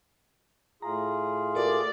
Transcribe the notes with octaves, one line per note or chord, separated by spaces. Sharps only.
A2 F4 G#4 A#5
F#4 A4 A#4 D5